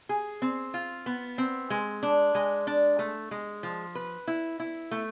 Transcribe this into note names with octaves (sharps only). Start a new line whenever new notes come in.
G#4
C4
F4
B3
C4
G#3
D4
G#3
D4
A3
G#3
F3
B4
E4
E4
A3